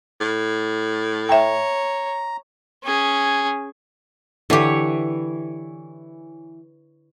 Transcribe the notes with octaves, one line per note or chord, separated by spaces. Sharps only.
A2
C#5 E5 G5 A#5
C#4 G#4
D3 E3 G4 C#5